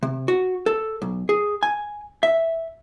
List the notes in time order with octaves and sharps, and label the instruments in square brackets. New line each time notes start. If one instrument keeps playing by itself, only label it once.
[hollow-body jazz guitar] C3
F#4
A4
B1
G#4
G#5
E5